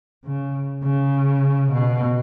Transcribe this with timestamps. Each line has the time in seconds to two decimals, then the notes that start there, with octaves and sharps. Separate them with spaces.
0.25 C#3
0.83 C#3
1.72 B2